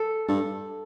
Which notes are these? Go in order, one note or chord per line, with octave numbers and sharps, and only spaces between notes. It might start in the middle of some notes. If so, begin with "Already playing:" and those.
Already playing: A4
G2 A4